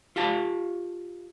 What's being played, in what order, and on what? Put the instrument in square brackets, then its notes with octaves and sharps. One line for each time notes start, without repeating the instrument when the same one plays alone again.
[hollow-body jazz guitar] F4 G4 F5 A5